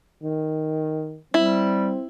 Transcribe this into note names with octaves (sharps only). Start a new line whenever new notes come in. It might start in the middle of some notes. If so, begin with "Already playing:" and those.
D#3
G3 C4 E4